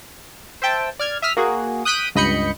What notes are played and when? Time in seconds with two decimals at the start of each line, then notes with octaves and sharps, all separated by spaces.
0.62 C5 E5 G5 A5
0.99 D5 F6 G#6
1.22 E5 D#6 F6 B6
1.37 A#3 F#4 G#4
1.85 D#6 F#6 G6 B6 D7 D#7
2.15 C#2 G2 D#5 B5 G6 C#7